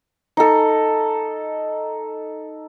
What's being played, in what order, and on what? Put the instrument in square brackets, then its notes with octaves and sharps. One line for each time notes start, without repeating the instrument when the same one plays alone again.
[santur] D#4 A4